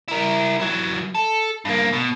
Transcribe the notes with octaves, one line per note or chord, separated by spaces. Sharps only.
E4 A#4
F#3 E4
A4
G2 A#3
B2